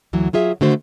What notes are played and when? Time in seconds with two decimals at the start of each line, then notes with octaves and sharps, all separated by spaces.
0.13 D2 E3 F#3
0.33 F#3 F4 G#4 E5
0.61 D3 D#3 A3 F#4 A4 C5